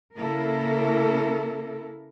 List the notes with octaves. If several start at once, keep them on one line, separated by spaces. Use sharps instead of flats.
C#3 A#3 E4 A4 A#4